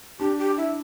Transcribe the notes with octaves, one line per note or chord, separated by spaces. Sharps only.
D4 G4
G4
E4